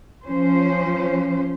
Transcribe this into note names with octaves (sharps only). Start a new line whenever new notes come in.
F3 C#4 C5